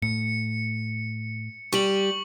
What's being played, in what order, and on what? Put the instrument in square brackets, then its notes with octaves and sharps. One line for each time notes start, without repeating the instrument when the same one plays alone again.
[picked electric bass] A2 [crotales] C#7
[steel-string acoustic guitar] G3 G4 [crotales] C#6 F#7